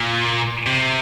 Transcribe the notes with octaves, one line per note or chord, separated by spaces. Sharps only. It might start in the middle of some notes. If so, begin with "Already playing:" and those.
Already playing: A#2
C3